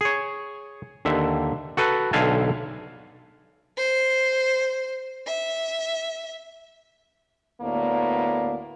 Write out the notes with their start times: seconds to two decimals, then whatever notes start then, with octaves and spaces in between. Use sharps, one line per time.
0.01 G#4 C#5
1.05 D#2 D3 E5
1.77 F#4 A4 B4
2.13 B1 D3 E5 F5 G#5 A5
3.77 C5
5.27 E5
7.61 D2 A2 A#3 B3 A#4 D5